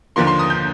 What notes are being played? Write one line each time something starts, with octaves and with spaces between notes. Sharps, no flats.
D#2 D3 F3 A#3 C6
C6
D#6
G6